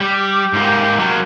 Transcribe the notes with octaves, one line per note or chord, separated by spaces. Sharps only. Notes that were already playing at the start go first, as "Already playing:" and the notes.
G3 G4
G#2 A#3 D#4
F#3 A#3